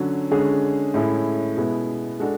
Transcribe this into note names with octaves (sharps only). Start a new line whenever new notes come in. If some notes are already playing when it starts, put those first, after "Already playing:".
Already playing: D3 F#3 C#4
D3 G#3 C#4 G#4
A2 G#3 C#4 E4 A4
B2 G#3 B3 E4
G#3 D4 F#4 A4